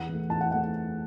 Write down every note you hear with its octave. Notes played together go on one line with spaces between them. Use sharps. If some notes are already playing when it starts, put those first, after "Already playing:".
Already playing: E2 F#5
E3 A3
E2 A5
F#5
E3 A3 F#5